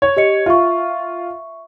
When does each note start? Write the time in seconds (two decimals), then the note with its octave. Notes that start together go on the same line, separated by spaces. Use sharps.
0.02 C#5
0.17 G4 D#5 C#7
0.46 F4 E5 C#6